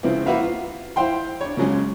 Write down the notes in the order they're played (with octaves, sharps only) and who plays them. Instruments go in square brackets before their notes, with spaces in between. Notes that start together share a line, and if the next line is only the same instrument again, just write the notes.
[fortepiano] C#3 F3 B3 C4 E4
A#3 E4 F#4 B4 E5 F5
F4
E4 C5 F5 G5 C6
D4 C#5
C#3 F3 F#3 G#3 C#4